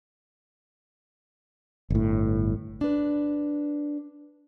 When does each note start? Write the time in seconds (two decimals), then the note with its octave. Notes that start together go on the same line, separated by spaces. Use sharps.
1.90 G1 A2
2.81 D4 B4